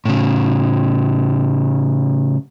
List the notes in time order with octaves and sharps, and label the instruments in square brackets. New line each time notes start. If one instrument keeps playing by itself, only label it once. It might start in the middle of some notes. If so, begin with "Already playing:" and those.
[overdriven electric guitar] A2 C#3